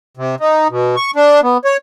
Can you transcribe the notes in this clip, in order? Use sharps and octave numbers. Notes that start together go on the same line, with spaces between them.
C3
D#4
B2
C#6
D4
B3
C#5